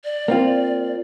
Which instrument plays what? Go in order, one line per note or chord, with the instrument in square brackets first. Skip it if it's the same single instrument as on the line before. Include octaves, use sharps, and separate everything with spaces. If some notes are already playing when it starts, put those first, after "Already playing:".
[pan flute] D5
[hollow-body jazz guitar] A#3 C4 F4